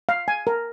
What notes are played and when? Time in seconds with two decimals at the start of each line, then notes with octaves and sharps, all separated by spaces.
0.09 F5
0.28 G#5
0.47 A#4